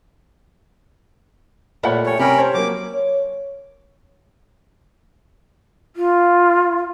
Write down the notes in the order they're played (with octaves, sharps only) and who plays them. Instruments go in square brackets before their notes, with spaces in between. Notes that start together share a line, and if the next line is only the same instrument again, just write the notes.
[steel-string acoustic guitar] A#2 G3 A3 [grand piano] C#5 F#5 B5
[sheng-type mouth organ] C#5 [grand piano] G5 G#5
[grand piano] C3 A#5 [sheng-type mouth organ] C#4 A#4 B5 [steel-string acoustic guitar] G4 G5
[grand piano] C5 C#5 A5
[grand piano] F#3 A#3 [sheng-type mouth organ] D6
[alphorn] C#5
[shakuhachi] F4